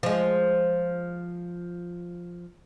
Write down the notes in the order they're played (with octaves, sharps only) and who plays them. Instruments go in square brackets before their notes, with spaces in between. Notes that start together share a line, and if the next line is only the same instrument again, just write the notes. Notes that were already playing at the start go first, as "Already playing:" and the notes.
[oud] F3 G#3